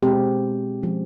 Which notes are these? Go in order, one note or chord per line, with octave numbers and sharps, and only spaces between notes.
B2 G#3 C4 G4
F3 G#3 C#4